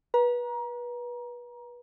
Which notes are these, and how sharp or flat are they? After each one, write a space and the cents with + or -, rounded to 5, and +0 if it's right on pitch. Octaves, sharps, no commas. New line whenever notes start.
B4 -25 A#5 +25